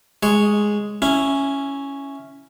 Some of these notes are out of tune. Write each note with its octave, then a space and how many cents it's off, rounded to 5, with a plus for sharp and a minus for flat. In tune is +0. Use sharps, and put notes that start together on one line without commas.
G#3 +0 C#5 +0
C#4 +0 E4 +0